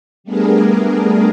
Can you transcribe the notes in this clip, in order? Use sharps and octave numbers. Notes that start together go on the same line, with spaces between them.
G3 A3 B3 D4 G#4 A#4